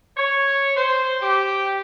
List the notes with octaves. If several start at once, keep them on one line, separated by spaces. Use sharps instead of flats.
C#5
C5
G4